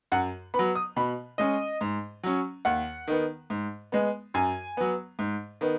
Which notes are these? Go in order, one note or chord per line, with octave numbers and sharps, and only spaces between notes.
F#2 F#5
B3 B5
F#3
D#6
B2 B5
G#3 C#4 D#5
G#2
F#3 C#4
D#2 F#5
D#3 B3
G#2
G#3 B3
F#2 G#5
F#3 B3
G#2
D#3 B3